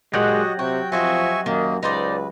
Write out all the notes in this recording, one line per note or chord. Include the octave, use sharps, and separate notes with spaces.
A#2 F#3 G#3 F#4 G4 D#5 F#5
C3 F#4 G5
F3 C4 F#4 D#5 E5 G#5 C#6
F#2 D#3 A#3
C#2 D#4 B4 C5 D5